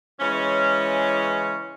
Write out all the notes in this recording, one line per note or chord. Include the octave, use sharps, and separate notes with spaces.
C#3 E3 G#3 C#4